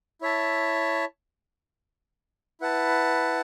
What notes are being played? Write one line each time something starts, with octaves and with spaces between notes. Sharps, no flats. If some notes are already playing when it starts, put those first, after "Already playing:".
E4 C#5 E5 A5
E4 B4 F#5 A5